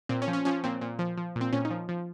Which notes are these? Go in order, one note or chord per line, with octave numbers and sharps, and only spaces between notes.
A#2 C4
C#4
F3
C#4
F3 C#4
A#2 C4
A#2
F3
F3
A#2
C4
A#2 C#4
D#4
F3
F3